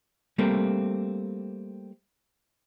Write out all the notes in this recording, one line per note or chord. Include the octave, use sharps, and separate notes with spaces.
G3 A3 A#3 C4